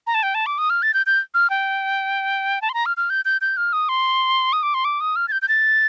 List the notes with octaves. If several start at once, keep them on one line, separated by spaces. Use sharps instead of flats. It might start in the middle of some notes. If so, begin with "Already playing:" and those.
A#5
A5
G5
A5
D6
D#6
F6
A6
G6
G6
F6
G5
A5
C6
A#5
F6
F6
G6
G6
G6
F6
D#6
C6
D#6
D6
C6
D6
D#6
F6
A6
G6
G6
A6